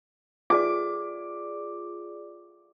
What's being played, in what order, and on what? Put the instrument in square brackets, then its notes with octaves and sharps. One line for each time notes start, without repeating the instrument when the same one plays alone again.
[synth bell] F4 G#4 D5 [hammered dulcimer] D6